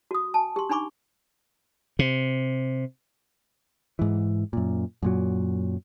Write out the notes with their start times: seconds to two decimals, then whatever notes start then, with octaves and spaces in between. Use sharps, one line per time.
0.11 F#4 D#6
0.34 G#5 A5
0.56 G4 C6
0.70 D4 D#4 G#5 B5 C#6 D6
1.99 C3
3.99 G#2 E3
4.53 F#2 A#2
5.03 F#2 A#2 F#3